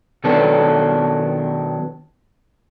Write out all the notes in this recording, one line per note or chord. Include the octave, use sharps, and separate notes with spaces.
B2 D#3 F#3 B3 D4 A4